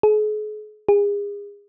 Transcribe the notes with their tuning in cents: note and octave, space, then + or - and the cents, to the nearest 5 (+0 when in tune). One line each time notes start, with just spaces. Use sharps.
G#4 +40
G#4 -35